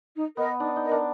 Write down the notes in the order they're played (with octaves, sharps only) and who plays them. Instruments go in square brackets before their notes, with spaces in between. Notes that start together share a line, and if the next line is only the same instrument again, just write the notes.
[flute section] D#4
[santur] B3 [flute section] A#4 D#5
[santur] D4 [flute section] D#4
[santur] D#4
[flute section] A#4 D#5
[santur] D4